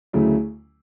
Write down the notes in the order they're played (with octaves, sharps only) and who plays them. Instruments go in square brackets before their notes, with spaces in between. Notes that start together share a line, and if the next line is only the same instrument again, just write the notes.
[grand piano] D2 C#3 F#3 A3 E4